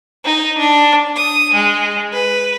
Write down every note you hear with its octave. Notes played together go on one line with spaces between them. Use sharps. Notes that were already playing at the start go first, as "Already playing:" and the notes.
D#4
D4
D#6
G#3
B4